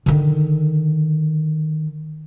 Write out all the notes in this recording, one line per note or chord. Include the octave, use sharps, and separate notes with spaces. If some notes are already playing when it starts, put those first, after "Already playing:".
D3 D#3